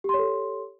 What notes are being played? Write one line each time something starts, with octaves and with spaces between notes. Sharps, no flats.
G4 A4 C#5 C6